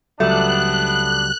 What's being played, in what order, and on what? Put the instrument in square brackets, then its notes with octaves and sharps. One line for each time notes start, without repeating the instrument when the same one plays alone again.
[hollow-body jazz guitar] C#2 F#3 G3 [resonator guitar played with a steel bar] A3 [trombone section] B3 D4 [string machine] F#6